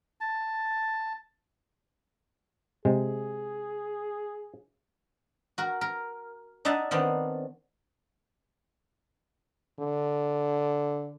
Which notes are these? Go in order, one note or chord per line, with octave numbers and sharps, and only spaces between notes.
A5
C3 G#3 G#4
F#4 A#4
A#4
D4 D#4 E5 F#5 A5
D#3 B3 C4 D4
D3